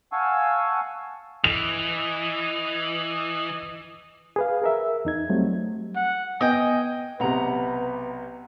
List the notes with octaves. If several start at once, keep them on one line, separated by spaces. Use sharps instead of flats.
F5 F#5 G#5 A5 C#6 E6
E3 D#5 F7
G#4 B4 F5
G#4 A#4 E5
E2 D#4 G#6
F#3 G3 A3 C4
F#5
B3 D#5 G5 G#5
B1 C3 B4 F#5 A#5